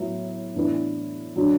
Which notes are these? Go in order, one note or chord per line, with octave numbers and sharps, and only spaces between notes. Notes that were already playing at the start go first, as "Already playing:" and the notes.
Already playing: A2 F#3 B3 E4
A2 E3 B3 D4 B4
D3 F#3